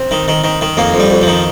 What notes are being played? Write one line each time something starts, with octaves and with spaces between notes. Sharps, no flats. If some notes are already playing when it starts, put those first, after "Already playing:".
Already playing: C4
D#3
D#3
D#3
D#3
F2 A#3
F2
G3
F2
F3
D#3